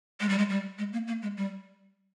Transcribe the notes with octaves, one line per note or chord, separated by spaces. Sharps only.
G#3
G3
G#3
G3
G#3
A#3
A#3
G#3
G3